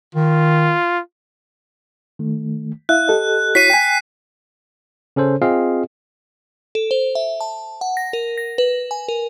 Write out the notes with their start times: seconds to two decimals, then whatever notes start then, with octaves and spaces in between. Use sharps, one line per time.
0.15 D#3 F4
2.19 D#3 A3
2.89 E4 E5 F5 F#6
3.08 G4 A4 D#5
3.55 E4 F#4 C#5 B6 C7 D#7
3.70 G5 G#5
5.16 C#3 C#4 A4 C5
5.42 C4 F4 G#4 D#5 F5
6.75 A4
6.91 C5
7.15 E5
7.40 A5
7.81 F#5
7.97 A#6
8.13 A#4
8.37 A#6
8.58 B4
8.91 G#5
9.08 A#4